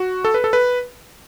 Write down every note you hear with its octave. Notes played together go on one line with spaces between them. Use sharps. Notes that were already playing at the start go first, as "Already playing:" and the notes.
Already playing: F#4
A4
B4
A4
B4